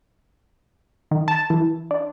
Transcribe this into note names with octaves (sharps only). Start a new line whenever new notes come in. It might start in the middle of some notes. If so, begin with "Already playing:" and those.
D#3
A5
E3
D4